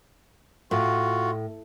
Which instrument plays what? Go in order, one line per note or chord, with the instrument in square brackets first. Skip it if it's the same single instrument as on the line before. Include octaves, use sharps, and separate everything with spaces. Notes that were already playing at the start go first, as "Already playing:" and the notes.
[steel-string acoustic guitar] A2 [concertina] F4 F#4